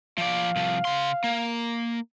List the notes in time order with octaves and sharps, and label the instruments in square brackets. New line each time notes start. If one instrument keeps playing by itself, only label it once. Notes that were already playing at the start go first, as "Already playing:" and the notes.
[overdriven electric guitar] F3 D5 [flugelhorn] F5
[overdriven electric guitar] C2 F3
C#3 C6
A#3